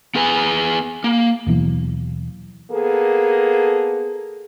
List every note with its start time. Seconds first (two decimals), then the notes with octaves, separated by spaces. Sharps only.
0.15 B3 G#4 B4 G#5
1.04 A#3
1.46 D#2 B2 E3 F#3
2.71 A#3 B3 G#4 A4